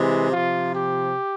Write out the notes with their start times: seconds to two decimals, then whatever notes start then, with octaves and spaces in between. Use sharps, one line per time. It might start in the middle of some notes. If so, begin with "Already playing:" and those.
Already playing: C3 E3 G#3
0.32 C3 F3 F4
0.75 G4